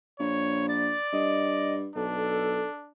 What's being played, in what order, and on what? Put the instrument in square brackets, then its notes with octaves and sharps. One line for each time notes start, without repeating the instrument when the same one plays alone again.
[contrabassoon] A#1 [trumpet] C#5
[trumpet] D5 [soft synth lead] A6
[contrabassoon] G2 [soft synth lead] D#5
[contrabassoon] B1 [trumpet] D4 [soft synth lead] A4